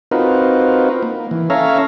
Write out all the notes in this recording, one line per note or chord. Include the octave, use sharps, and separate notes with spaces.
C4 D#4 F4 F#4 A#4 B4
A#3
E3
C#4 A4 C#5 E5 F5 A#5